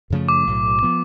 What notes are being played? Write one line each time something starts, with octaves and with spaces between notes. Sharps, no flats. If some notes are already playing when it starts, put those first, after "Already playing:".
F#2 C#3 F3 A3
D6
B1 A2 F#3
F3 B3